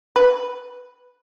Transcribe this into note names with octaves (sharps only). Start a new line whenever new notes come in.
B4